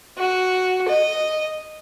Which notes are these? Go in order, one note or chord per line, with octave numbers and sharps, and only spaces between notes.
F#4
D#5